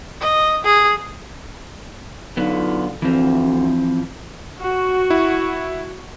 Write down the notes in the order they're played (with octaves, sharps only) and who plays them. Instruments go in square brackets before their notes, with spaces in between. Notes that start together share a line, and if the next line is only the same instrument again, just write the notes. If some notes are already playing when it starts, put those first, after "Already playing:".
[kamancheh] D#5
G#4
[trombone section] D3 F4 [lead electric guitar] F#3 B3 [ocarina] D#4
[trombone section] D2 [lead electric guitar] E3 F3 [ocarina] C4
[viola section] F#4
[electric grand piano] E4